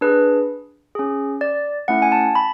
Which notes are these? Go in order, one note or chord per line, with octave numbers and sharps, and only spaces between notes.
D4 G#4 B4
C#4 G#4
D5
A3 C#4 E4 F#5
G#5
A5
B5